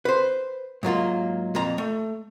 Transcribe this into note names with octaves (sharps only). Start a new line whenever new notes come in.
B4 C5
G#2 F#3 A#3 F4
F2 A#2 A#5
A3